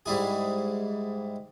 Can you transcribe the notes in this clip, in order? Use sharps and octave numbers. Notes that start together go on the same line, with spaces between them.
G#2 G3 E4 G#4